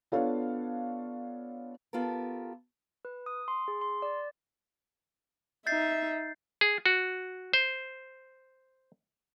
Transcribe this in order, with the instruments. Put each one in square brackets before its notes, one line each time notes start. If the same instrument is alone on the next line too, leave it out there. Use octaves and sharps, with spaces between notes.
[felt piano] B3 D4 F4 A4 C#5 F5
[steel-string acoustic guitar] B3 F4 G4 A4 A#4
[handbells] B4
D#6
C6
G#4
C6
D5
[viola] D#4 E5 [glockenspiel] G6 A6 C7
[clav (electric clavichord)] G#4
F#4
C5